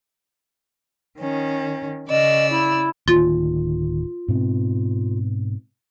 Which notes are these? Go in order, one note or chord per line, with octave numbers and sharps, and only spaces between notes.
D#3 C#4
C#3 D5 D#5 E6
E4
D1 D#3 A#3 F4
G#2 B2 C4